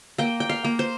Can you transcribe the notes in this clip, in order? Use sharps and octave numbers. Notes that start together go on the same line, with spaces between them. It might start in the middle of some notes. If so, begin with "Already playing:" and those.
A#3 G5
G5
F5
A#3
C5